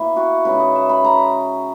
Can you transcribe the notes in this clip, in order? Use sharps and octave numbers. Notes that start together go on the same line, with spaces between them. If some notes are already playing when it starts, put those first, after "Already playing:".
Already playing: B2 A#3 E4
F#4
C#3 G#3 D#4 B4
D#5
E5
B5
A#5